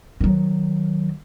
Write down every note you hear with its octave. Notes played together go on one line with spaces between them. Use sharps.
D#3 F#3